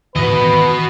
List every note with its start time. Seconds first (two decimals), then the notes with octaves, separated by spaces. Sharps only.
0.16 G#2 D#3 E3 F#4 B4 D#5